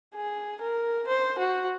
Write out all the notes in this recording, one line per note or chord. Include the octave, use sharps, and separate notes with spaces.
G#4
A#4
C5
F#4